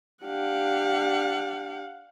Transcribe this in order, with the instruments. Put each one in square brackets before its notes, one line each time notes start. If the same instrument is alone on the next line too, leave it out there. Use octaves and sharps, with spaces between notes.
[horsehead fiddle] D4 G4 [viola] F5 F#5